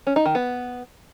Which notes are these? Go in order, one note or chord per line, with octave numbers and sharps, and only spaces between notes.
C#4
D#4
D#3
B3